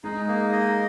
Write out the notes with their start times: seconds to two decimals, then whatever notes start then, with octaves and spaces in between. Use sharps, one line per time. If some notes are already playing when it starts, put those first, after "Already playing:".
0.04 G#3 D#4 G#4
0.28 A#3
0.52 D#5